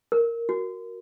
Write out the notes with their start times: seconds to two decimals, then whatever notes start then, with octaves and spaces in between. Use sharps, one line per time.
0.12 A#4
0.49 F#4